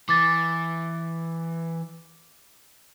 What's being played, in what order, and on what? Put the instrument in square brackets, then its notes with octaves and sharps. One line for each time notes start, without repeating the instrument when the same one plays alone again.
[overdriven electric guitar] E3 [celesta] D6 A6